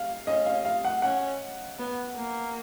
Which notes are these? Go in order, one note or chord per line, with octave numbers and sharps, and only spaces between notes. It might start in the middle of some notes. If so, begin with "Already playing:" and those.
Already playing: F5
C#4 D#5
F5
F5
F#5
C#4 F#5
B3
A#3